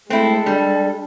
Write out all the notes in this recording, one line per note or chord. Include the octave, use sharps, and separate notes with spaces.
G#3 A3 C4 E4 A4
G3 D4